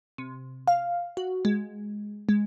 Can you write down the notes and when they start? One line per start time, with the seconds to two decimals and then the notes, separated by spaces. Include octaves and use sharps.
0.18 C3
0.68 F5
1.17 F#4
1.45 G#3
2.29 G#3